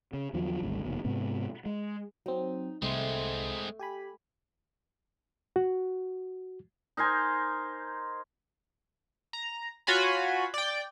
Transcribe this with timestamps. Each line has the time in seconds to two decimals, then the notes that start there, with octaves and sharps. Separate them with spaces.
0.13 C#3
0.34 E2 D3 F3 F#3
0.63 G#1 D2 G3
0.84 F1 D#2 B2
1.04 G#2 C3 B3
1.66 G#3
2.26 F#3 C4 D#4
2.82 C2 G#3 A3 C4 C6
3.79 G4 G#5 B5
5.56 F#4
6.97 D#4 A#4 C5 G#5
9.33 A#5
9.87 F4 F#4 C#5 G#5 B5
10.54 D5 G5